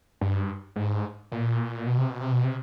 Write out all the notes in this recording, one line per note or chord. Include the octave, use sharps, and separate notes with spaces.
G2
G#2
A#2
B2
C3
B2
C3
B2
C3